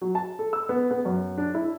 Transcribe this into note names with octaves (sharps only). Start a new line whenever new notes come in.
F#3
A5
A4
E6
B3
B3
F#2
D4
E4